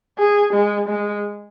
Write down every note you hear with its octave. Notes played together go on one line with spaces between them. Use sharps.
G#4
G#3
G#3